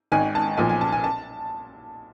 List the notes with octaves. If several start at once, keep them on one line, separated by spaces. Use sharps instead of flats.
G#1 G#2 D#3 G#5
A5
B1 A#2 F3 G#5
G#5
A5
G#5
A5